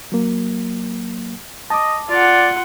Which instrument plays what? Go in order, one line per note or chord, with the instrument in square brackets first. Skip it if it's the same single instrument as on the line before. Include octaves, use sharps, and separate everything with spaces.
[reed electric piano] F#3 A#3
[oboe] D#5 [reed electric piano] A5 D6
[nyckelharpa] F4 F#5 [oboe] D5